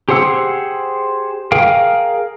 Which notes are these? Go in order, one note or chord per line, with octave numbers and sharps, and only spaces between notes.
G4 G#4 C5 F#5 E6
G#4 A#4 F5 G5